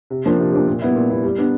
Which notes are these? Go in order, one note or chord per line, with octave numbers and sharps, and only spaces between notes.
C3
F3 A#3 D4 G4
C3
F3 A#3 D4 G4
A#2
G3 B3 E4
A#2
G3 B3 E4
G3
B3 D4